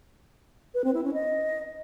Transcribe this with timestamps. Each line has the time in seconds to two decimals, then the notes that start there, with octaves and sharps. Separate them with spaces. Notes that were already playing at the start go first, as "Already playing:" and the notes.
0.74 B4
0.84 C4
0.94 E4
1.04 C#4
1.14 D#5